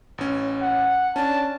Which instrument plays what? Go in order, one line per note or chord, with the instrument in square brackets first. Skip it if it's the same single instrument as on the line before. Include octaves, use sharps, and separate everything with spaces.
[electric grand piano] A1 C#4
[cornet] F#5
[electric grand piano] C#4 D4 [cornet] A5